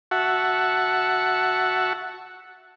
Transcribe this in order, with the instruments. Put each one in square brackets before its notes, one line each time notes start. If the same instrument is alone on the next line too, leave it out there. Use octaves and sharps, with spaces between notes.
[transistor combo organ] F#4 E5 F#5 A5 C#6